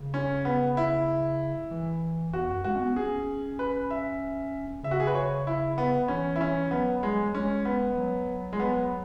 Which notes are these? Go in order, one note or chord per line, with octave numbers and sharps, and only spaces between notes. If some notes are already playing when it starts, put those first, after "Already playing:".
Already playing: C#3
C#4
B3
E4
E3
E2 F#4
F#2
G#3 F#4
C#4
B3
C#4 G#4
B4
E5
C#3 E5
F#4
G#4
B4
C#5
E4
B3
E3 C#4
E4
C#4
F#3 B3
G#3
F#3
G#3 C#4
B3
F#3
G#3
B3